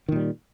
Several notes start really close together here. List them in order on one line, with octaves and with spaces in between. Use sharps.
D#3 A#2 G3